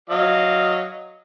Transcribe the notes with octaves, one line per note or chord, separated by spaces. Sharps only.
F#3 D#5 F5